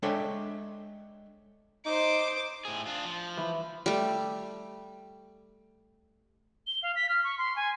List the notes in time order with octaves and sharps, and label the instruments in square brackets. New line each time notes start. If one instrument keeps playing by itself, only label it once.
[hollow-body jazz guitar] G#3 D4 A4 C#5 E5 G5
[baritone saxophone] D#4 [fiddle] C5 D6
[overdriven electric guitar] A2 G#4
D4 F4
F3
[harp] E3
[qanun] G3 A3
[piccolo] G7
F5
B6
F6
C#6
C6
G#5